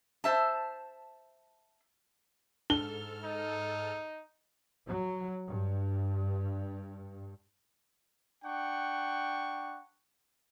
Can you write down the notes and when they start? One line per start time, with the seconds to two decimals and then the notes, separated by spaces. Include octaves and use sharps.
0.24 C5 E5 A5
2.70 G#2 D4 A4 F6 G7
3.24 D#4
4.86 F#3
5.48 G2
8.44 D4 F#5 G5 C#6